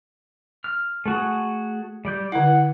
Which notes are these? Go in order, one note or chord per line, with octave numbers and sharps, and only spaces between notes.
F6
A3 F#4 G#4
G3 D5 G6
D3 E4 F#5